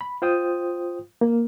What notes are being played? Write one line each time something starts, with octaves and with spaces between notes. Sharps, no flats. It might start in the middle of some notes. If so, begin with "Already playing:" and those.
B5
F4 C5 G5 D#6
A#3